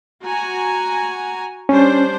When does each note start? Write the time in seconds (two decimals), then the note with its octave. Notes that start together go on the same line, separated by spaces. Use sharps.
0.23 F#4 G#5 A#5
1.69 G3 C#4 D4 C5